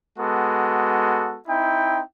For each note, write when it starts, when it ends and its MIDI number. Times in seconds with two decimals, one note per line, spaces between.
0.18 1.38 56
0.18 1.38 59
0.18 1.38 66
0.18 1.38 69
1.47 2.00 60
1.47 2.00 63
1.47 2.00 64
1.47 2.00 79